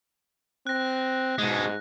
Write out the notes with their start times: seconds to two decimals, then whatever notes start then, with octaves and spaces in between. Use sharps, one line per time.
0.67 C4 F#6 A#6
1.38 G#2 B2 G#3